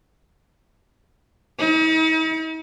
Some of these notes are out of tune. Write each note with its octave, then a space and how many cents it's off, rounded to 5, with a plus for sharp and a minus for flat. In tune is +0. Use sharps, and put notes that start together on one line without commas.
D#4 +45